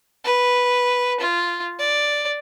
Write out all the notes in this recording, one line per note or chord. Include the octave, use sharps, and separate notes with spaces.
B4
F4
D5